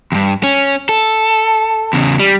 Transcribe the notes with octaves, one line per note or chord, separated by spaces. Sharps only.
E2 G2
C#4
A4
E2 C#3
G3